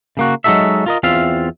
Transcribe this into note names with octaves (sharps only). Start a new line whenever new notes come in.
C#3 A#3 F#4
F#3 G#3 D#4 F#4 A4 E5
F4 A#4 D#5
E2 C4 F4 E5 F5